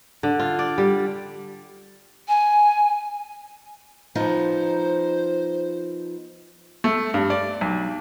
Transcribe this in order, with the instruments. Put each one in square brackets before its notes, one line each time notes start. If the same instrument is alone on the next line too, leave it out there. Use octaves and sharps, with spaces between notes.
[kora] D3
F4
D5
G3
[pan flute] G#5
[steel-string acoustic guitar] F3 B3 D#4 [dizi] C5
[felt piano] A3
G2
D5
B1